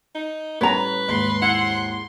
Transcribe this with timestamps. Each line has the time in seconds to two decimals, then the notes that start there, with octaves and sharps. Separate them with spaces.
0.15 D#4
0.61 A2 G3 C#4 B4 C#5 A#5
1.08 D#2 G#2 C6
1.42 E4 F#5